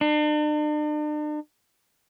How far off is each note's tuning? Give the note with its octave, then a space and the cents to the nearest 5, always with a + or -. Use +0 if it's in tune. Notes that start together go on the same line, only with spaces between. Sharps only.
D4 +45